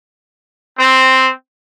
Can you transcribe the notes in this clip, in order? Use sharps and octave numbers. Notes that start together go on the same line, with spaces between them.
C4